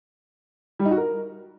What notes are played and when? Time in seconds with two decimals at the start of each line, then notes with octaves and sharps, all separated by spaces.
0.79 G3
0.85 D#4
0.91 F#4
0.97 A#4